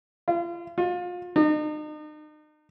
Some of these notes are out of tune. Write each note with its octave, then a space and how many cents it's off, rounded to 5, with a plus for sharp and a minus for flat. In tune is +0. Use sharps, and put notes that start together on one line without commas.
F4 -35
F4 +30
D#4 -40